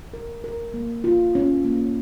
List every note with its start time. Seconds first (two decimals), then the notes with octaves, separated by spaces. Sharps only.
0.14 A#4
0.44 A#4
0.74 A#3
1.04 F4
1.35 C#4
1.65 A#3